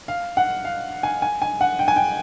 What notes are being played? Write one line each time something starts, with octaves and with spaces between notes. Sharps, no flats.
F5
F#5
F5
G#5
G#5
G#5
F#5
G5
G#5
G5